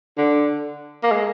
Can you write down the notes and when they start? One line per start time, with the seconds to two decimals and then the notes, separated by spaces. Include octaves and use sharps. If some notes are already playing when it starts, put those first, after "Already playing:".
0.18 D3
1.03 A#3
1.12 G#3